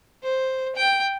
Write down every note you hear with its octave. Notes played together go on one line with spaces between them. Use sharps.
C5
G5